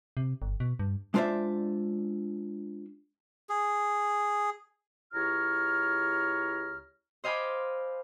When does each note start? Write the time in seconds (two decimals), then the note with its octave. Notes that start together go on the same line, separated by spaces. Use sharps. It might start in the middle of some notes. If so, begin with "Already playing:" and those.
0.17 C3
0.42 G1
0.60 B2
0.79 G2
1.14 G#3 D4 F4 C5 D5 E5
3.49 G#4
5.14 C#2 E4 G4 C#5 A#5 F6
7.24 C5 D#5 F5 G#5 B5 D6